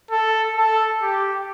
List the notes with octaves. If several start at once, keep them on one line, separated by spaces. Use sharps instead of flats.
A4
A4
G4